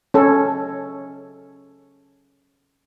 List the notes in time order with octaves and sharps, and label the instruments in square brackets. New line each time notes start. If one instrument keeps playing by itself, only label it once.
[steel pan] C#4 A4